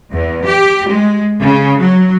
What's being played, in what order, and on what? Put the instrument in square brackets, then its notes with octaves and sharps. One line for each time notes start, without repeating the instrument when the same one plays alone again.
[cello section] E2
G4
G#3
C#3
F#3